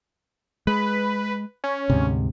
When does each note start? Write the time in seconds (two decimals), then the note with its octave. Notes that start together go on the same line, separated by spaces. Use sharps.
0.67 G#3 B4
1.64 C#4
1.90 D2 G#2 C3